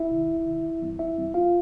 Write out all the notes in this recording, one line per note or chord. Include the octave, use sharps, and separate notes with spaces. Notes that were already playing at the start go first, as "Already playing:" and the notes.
Already playing: E4 E5
C3 D#3
C2
C3 D#3
G1
G2 E3 G3 C4
G1 E4 E5
G2 E3 G3 C4
A#1 F4 F5